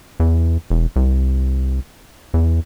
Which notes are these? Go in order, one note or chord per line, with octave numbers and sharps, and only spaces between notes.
E2
E1
C2
E2